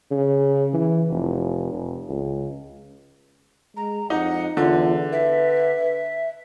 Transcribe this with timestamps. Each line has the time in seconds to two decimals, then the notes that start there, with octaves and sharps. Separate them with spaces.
0.11 C#3
0.74 E3
1.10 F1
1.72 F1
2.09 C#2
3.77 G#3 A#5
4.10 F2 D#4 F#5
4.57 E2 D3 F4
5.12 B4 E5